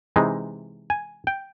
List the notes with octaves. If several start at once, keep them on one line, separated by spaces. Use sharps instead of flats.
C3 E3 G#3 C4 D#4
G#5
G5